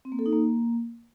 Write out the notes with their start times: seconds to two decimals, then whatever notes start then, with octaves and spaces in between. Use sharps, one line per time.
0.05 C4
0.12 A#3
0.19 A4
0.26 D#4
0.33 A#3